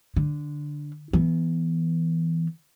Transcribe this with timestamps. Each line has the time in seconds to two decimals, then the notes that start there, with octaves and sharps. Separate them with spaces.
0.16 D3
1.13 E3 B3